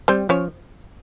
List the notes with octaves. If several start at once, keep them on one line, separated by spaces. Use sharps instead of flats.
G3 C4 C5
F3 C#4 C#5